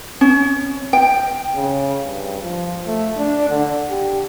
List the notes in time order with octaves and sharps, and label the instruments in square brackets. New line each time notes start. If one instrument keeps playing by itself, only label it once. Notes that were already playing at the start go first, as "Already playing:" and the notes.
[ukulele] C#4
G5
[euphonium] C#3
G2
F3
A3
D4
D3
G4